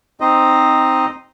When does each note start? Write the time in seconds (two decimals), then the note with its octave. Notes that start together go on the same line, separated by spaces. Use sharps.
0.20 C4 D#4 C5 D#5